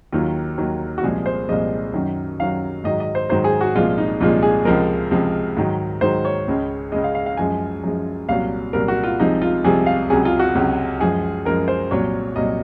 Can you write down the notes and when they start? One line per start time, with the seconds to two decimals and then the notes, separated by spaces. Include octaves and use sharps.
0.12 D#2 D#3 F#3 F4
0.58 D#2 D#3 F#3
0.98 F#4
1.03 C2 A#2 F3 G#3 G#4
1.26 C5
1.49 C2 A#2 F3 G#3 D#5
1.93 F#2 D#3 F#3
2.39 F#2 D#3 F#3 F5
2.84 G#2 D#3 F#3 D#5
3.00 D#5
3.15 C5
3.29 G#2 D#3 F#3 C5
3.44 G#4
3.61 F#4
3.75 C2 A#2 F3 G#3 F4
3.98 D#4
4.20 C2 A#2 F3 G#3 F4
4.43 G#4
4.65 C#2 C3 F3 G#3 A#4
5.11 C#2 C3 F3 G#3
5.57 G#2 D#3 F#3
6.01 G#2 D#3 F#3 C5
6.25 C#5
6.48 C#2 C#3 G#3
6.92 C#2 C#3 G#3 D#5
7.04 F5
7.15 F5
7.26 F5
7.37 F#2 F3 G#3 G#5
7.83 F#2 F3 G#3
8.29 C2 A#2 F#3 F5
8.73 C2 A#2 F#3 A#4
8.88 F#4
9.04 F4
9.19 C2 C3 F3 G#3 D#4
9.42 F4
9.64 C2 C3 F3 G#3 G#4
9.86 F5
10.10 C#2 C3 F#3 G#4
10.25 F4
10.39 F#4
10.55 C#2 C3 F#3
11.00 F#2 F3 G#3 G#4
11.45 F#2 F3 G#3 A#4
11.68 C5
11.91 C2 A#2 F#3 C#5
12.36 C2 A#2 F#3 D#5